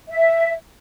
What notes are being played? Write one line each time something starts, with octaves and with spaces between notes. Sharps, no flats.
E5